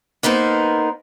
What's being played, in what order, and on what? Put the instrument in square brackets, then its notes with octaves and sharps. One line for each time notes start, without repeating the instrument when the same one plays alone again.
[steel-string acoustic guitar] A#3 B3 D#4 A#4 C5